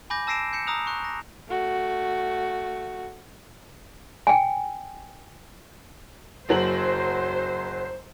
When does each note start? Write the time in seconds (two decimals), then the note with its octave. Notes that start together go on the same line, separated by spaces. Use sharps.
0.10 G#5 B5 D6 G6 A#6
0.27 A5 E6 A#6 C7 D7 E7
0.53 G6 C7 C#7 E7
0.67 A#5 D#6 E6 F#6 F7
0.87 C#6 F#6
1.04 A#6
1.49 A3 F#4
4.27 G5 G#5
6.49 F#1 F#3 C5 F#7